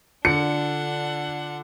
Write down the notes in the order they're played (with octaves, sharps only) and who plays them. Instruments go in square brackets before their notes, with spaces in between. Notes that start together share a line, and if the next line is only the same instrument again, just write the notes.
[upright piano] D3 [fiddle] D4 F#5 [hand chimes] F4 A4 D5 [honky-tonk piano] C#7